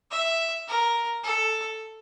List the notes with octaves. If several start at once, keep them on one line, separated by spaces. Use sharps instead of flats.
E5
A#4
A4